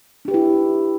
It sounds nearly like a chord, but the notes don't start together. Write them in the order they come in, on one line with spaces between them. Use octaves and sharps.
D4 G4 B4 E4